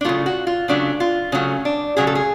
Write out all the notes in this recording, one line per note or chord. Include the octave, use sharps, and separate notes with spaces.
D4
C#3 F#3 A3 F4
F#4
F4
C#3 F#3 A3 D4
F4
C#3 F#3 A3 C#4
D4
C#3 F#3 A3 G#4
A4
G#4